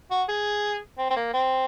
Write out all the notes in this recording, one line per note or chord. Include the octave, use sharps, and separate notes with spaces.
F#4
G#4
C4
C4
A#3
C4